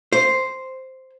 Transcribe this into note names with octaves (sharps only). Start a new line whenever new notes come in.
C5